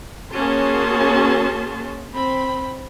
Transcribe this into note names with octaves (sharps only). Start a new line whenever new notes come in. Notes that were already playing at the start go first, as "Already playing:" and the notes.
A#3 C#4 F#4 G#4 A5 C6
C4 B5